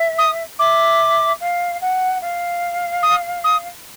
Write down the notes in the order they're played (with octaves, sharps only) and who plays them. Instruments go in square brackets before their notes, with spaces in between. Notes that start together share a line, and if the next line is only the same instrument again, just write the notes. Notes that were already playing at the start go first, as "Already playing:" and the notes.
Already playing: [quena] E5
[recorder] D#6
[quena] E5 [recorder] D6
[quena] F5
F#5
F5
[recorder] D#6
D#6